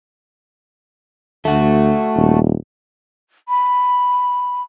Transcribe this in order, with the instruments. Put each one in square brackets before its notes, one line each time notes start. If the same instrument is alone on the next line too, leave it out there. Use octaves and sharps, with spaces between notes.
[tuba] D2 [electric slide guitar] A3 F#4
[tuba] D#1
[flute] B5